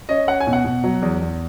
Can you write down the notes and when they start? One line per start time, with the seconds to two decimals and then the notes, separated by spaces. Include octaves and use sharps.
0.09 C#4 D#5
0.27 C#4 F#5
0.40 G#5
0.47 B2
0.53 F#5
0.65 B2
0.84 F#3
1.02 E2
1.21 E2